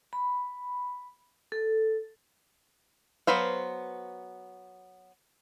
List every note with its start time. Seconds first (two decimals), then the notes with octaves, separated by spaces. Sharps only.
0.13 B5
1.52 A4
3.27 F#3 B3 B4 C5 F5